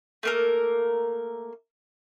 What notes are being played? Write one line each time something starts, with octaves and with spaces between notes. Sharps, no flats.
A3 A#3 A#4